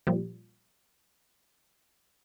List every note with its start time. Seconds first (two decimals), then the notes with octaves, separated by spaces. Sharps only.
0.07 A#2 F3 G3